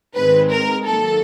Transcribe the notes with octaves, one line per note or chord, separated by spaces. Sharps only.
G#2 D#3 G#3 C4 B4
A#4
D#3 F#3 A#3 A4